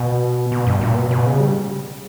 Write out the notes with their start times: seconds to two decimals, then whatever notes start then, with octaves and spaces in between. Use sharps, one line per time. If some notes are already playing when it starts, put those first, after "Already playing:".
Already playing: B2
0.52 B2
0.67 G2
0.81 A#2
0.96 B2
1.11 B2
1.26 C#3
1.40 G3